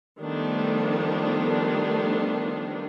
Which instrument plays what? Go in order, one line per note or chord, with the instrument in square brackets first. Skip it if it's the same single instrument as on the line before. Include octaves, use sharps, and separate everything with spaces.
[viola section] D#3 F3 G3 A3 B3 D4